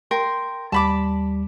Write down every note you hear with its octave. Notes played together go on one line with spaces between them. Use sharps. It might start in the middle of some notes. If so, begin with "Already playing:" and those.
A#4 G5 C6
D#2 G3 A5 B5 D6